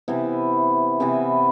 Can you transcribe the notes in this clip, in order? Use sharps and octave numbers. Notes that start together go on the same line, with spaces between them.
C3 E3 B3 E4
C3 E3 B3 E4